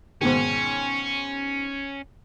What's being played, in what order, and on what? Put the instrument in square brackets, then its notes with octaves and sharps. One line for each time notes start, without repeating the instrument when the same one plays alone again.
[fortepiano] G#2 B2 D#3 [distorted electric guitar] C#4